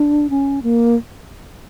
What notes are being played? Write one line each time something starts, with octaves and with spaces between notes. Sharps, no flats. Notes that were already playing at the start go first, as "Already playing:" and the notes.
Already playing: D4
C#4
A#3